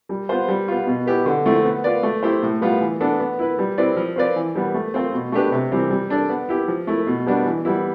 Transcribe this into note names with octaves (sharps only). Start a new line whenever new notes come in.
G3
B3 F4 C5
G3
B3 F4
B2
B3 E4 G4 B4
D3
F3 A3 C4 E4
B3
F4 B4 D5
A3
E4 G4 C5
A2
G3 B3 F4
E3
B3 D4 A4
B3
E4 B4
G3
C4 E4 B4 D5
F3
C4 F4 B4 D5
E3
G3 B3
A3
C4 F4 C5
B2
A3 D4 G4 B4
C3
E3 G3 C4 G4
G3
D4 A4 D5
B3
E4 G4
F3
A3 E4
B2
G3 B3 D4
E3
G3 B3 E4